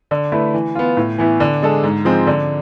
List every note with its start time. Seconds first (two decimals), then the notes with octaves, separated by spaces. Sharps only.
0.11 D3
0.32 A3 E4 B4
0.54 E3
0.75 B3 F4
0.97 A2
1.18 E3 B3 E4
1.40 D3
1.62 G#3 D4 A4
1.84 G#2
2.05 F3 G#3 C4
2.27 D3